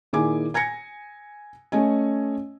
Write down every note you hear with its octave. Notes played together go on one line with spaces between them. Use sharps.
A#2 D#3 E4 G#4 G#5 D6
G#5 G#6 A#6 C#7
A3 C#4 D#5 G#5